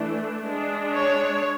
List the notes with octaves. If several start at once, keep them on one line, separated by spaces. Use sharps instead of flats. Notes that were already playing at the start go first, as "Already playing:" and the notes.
Already playing: E3 A3 D4
G#3 D4
C#5